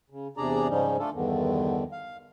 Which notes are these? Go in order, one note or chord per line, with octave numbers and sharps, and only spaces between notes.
C#3
E2 C3 D4 G#4 D5 A#5
G#2 C#3 F3 G3 C#4 D#4
A3 D4 F4 A4
E2 G2 D3 D#3
F5